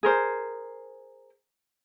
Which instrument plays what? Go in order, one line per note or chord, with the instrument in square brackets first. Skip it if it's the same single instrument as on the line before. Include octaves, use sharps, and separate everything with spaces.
[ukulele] G#4 A#4 C5